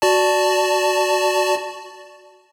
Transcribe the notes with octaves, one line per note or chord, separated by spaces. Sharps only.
F#4 D5 A5